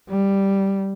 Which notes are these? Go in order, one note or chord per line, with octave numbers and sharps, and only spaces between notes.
G3